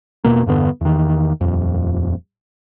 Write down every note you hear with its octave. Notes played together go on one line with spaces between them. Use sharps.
E1 G2 B2 A#3
E2 G2 D3 B3
E2 D#3
D#1 F2